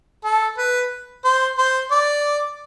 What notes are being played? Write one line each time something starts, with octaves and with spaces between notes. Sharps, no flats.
A4
B4
C5
C5
D5